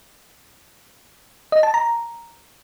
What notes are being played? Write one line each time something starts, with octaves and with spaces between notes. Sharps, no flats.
D#5
A5
A#5